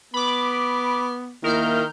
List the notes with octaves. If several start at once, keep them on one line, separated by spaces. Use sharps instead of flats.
B3 B5 D6
D#3 A#3 E4 A#4 F6 G6